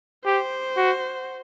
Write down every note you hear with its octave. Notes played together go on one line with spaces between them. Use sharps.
G4 C5
F#4